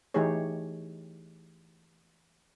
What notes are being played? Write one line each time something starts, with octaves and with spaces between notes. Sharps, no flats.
E3 A3 D#4 G4 G#4 C#5